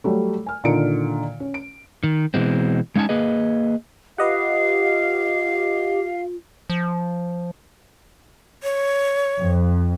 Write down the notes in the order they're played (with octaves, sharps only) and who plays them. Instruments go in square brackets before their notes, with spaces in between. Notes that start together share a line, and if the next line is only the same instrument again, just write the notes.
[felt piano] F#3 G3 A3
G#5 F6
A#2 D3 D#3 D#4 C#7 D7
C#4
D7
[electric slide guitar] D#3
B2 E3 G#3 C4
G#3 C#4 D#4 G#5 A5
A#3 G#4 B4 D#5
[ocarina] F4 [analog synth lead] G4 [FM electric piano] B4 D#5 F#5 [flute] F5
[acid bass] F3
[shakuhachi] C#5
[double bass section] F2